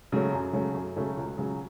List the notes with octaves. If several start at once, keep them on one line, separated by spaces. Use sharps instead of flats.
C#3 F#3 A3 C#4
F#2
C#3 F#3 A3 C#4
F#2
C#3 F#3 A3 C#4
C#2
C#3 F#3